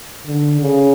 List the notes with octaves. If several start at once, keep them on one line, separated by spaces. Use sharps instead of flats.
D3
C#3